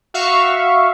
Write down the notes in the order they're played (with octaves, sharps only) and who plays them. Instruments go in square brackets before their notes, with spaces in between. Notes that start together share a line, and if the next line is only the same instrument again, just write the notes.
[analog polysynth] F#4 E5 F5 C#6